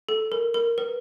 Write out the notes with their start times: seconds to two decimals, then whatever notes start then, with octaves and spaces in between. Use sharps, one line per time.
0.09 A4
0.32 A#4
0.54 A#4
0.78 B4